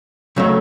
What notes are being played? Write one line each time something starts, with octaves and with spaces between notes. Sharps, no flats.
C#3 F#3 A3